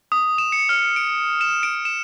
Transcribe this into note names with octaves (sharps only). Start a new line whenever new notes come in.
D#6
E7
C#7
F6
D7
E7
D7
E7